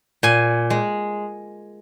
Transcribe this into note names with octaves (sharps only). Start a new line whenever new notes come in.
A#2 G#5
G#3